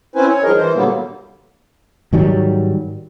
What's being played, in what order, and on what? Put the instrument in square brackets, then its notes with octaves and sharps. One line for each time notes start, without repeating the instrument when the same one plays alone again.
[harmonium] C4 C#4 E4 B4 C5 G#5
C#5
G2 D#3 F3 G#4 A#4 D#5
E3 C5
A#2 D3 F#3 G3 A#3 B3
[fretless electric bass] G#2 D#3 F#3 G3